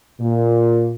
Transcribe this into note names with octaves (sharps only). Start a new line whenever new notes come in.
A#2